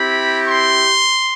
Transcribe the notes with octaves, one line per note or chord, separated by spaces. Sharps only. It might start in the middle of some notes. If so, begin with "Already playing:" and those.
Already playing: C4 E4 G4 B5
C6